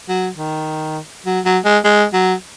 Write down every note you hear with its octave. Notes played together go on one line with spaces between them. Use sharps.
F#3
D#3
F#3
F#3
G#3
G#3
F#3